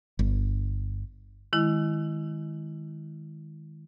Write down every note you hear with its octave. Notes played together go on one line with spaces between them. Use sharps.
G1
D#3 G#3 E4